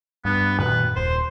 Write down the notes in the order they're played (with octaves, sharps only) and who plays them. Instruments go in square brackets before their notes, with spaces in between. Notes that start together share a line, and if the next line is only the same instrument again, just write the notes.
[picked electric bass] G2 [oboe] B3
[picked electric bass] F#2 A#2 D#3 [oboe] B4
[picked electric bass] D#1 [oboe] C5